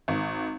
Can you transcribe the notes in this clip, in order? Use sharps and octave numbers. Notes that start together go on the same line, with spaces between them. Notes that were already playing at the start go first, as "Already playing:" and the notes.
G#1